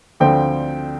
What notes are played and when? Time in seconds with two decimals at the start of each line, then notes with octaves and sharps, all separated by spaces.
0.20 D2 D3 F3 C4 G5